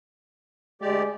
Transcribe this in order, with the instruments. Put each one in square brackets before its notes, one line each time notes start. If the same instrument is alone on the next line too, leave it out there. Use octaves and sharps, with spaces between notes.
[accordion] D2 G4 D5 [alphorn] G#3